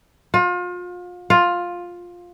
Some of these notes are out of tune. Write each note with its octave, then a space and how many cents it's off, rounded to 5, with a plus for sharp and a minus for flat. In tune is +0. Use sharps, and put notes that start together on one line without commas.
F4 +35
F4 +10